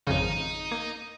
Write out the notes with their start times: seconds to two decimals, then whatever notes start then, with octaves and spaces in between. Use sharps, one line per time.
0.07 G#1 F2 C#3 D#4
0.71 A#3